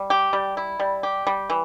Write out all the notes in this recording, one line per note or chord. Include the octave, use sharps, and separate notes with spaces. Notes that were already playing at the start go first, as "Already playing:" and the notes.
Already playing: G3
G4
G3
E4
G3
G4
G3
E3